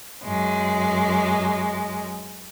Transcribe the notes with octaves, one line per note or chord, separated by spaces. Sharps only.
F#2 G#3